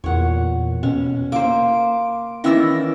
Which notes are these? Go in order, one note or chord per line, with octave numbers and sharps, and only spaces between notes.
E2 A#2 C#5 F#5
B2 C#4
A#3 C5 D6 D7
D#3 E3 C#4 D5 E6 A#6